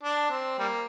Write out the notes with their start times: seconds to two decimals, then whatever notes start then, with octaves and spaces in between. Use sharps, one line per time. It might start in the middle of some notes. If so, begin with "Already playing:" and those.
0.03 D4
0.30 C4
0.59 G3 A#3